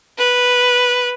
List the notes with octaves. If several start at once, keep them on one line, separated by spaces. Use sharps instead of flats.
B4